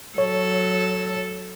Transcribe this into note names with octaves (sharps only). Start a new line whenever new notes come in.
F#3 A4 C#5